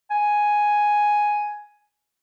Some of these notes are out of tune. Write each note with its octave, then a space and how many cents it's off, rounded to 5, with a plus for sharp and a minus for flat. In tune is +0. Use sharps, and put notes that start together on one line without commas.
G#5 +5